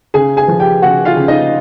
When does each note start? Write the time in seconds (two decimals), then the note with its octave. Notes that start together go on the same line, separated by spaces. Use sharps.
0.14 C#3 G#4 G#5
0.37 G#4 G#5
0.48 F3
0.60 G4 G5
0.82 C#3 F#4 F#5
1.05 F4 F5
1.17 C#3
1.28 D#4 D#5